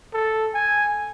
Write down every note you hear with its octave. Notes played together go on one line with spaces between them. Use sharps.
A4
G#5